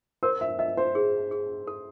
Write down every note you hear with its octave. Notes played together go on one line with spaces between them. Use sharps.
A#4 C5
E5
D#5 E5
C5
G#4
G#4
A4